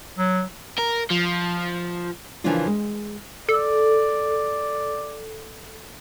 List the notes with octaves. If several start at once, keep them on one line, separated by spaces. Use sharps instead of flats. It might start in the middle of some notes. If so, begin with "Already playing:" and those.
F#3
A#4
F3
C#3 E3 F3 A#3 D4 F4
G#3
A4 D5